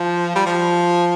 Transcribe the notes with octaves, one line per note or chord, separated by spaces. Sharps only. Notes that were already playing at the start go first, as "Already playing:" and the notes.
Already playing: F3
G3
F3